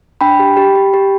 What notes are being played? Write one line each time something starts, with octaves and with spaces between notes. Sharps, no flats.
D4 G5 B5
G4
G4
G4
G4